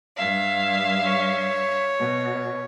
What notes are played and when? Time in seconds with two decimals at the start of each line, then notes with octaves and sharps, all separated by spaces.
0.16 G2 E5 F5
1.05 C#5
1.99 B2